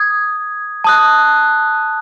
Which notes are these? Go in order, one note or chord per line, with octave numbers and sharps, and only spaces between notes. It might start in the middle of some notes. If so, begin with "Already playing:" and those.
Already playing: D#6 G#6
A5 D#6 F#6